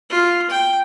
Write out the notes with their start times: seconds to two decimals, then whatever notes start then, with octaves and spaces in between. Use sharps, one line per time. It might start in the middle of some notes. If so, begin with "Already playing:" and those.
0.10 F4
0.50 G5